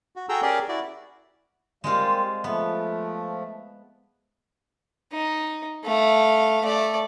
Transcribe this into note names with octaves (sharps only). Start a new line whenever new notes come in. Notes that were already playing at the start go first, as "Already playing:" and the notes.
F#4
F#4 G#4 A4 G5 A#5 E6
C#4 G4 G#4 A#4 D5
E4 F#4 D5
G3 G#3 A#3 C4 F4
F3 A3 B3
D#4
A3 F5
A3 D5